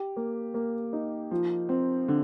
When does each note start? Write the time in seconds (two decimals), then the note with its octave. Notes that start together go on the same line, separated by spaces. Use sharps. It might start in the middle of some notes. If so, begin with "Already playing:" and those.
Already playing: G4
0.16 A#3
0.54 A#3
0.93 D#4
1.31 F3
1.69 C4
2.08 D3